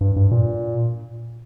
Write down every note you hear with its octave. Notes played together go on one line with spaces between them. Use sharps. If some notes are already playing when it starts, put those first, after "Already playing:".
G2
G2
A#2